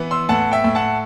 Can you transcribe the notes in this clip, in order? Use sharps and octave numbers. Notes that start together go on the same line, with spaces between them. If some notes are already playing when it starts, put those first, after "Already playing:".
Already playing: E3 B3
C6 E6
A2 F#5 A5
E5 G5
A2
F#5 A5